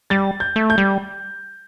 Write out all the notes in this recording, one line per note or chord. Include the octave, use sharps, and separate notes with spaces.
G3 A6
G6
A3
G6
G3